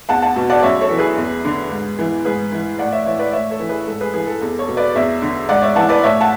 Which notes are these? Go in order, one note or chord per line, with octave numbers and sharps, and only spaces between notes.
E2 F#5 A5
F#5 A5
B2
D5 F#5
F#2 C#5 E5
A4 C#5
E3
G#4 B4
E2
D3
G#2
E3
G#2 G#4 B4
E3
A2 D5 F#5
C#5 E5
E3 C#5 E5
B4 D5
A2 C#5 E5
A4 C#5
E3
G#4 B4
G#2 A4
G#4 B4
E3 G#4
A4
E2 A4
A4 C#5
B2
B4 D5
E2 C#5 E5
D3
G#2 D5 F#5
C#5 E5
E3 F#5 A5
B4 D5
A2 C#5 E5
F#5 A5